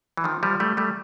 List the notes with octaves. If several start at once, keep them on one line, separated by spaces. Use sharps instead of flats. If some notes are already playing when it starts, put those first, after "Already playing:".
E3
D#3 F3
F3 G3
G3 A3
G3 A3